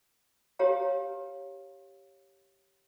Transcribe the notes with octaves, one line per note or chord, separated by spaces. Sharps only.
G4 B4 C#5 F5 A#5